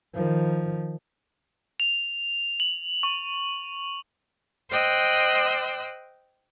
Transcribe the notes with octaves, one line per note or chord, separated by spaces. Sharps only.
D#3 F3
F7
F#7
C#6
C5 D#5 G5 E6 F#6